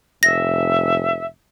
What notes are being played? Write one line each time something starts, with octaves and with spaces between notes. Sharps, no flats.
F1 E5 A#6